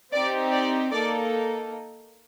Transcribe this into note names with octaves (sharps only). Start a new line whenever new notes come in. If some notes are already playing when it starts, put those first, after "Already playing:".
C4 D#4 G4 D5
D5
A#3 D#4 A4 D5